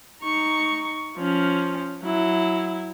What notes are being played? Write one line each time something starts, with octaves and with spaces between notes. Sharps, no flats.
D#4 C#6
F3 C#4
F#3 E4